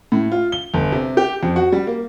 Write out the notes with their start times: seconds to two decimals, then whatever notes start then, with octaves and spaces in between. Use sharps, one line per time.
0.12 A2
0.32 F4
0.52 G7
0.74 G1
0.92 C3
1.17 G4
1.43 F2
1.56 F#4
1.72 G3
1.87 A#3